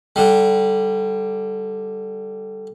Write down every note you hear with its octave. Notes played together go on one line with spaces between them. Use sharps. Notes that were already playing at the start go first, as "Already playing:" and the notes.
D3 G3